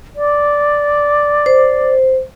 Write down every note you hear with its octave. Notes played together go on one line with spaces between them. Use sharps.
D5
C5